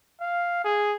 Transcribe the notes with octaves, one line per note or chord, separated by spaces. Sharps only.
F5
G#4